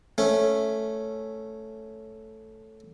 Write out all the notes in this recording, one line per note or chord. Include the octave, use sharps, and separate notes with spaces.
A3 C#4